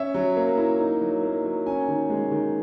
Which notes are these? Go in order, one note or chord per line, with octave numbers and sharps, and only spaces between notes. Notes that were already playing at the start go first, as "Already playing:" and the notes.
Already playing: C#4 E5
F#3
A#3
E4
D#4
F#3
A#3
F#3
C#4 G#5
D#3
G#3
D#3